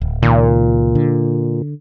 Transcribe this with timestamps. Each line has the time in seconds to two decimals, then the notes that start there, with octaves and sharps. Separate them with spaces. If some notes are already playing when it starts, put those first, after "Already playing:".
0.01 D1
0.22 C#2 A#2 D#3
0.95 D3